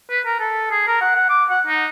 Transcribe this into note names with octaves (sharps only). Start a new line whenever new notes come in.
B4
A#4
A4
G#4
A#4
F#5
F#5
D6
F#5
D#4